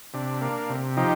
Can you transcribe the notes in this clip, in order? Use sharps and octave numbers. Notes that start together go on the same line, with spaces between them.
C3 D4
A#3
C3
F3 D#4 G4